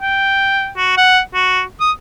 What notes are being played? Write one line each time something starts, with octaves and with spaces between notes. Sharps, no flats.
G5
F#4
F#5
F#4
D#6